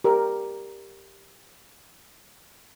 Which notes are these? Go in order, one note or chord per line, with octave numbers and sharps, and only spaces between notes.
G4 A#4